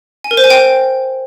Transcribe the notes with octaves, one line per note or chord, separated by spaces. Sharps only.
G#5
A#4
C5
G#5
G5